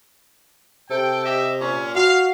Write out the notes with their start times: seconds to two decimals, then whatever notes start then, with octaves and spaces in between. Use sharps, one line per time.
0.90 C3 A4 G5
1.25 G4 D#5 E5
1.61 A#2 C#4
1.95 F#4 F5